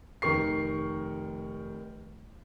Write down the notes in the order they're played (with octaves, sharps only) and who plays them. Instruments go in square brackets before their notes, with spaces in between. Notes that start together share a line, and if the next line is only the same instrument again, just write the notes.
[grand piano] F1 D#3 A#4 C#6 C7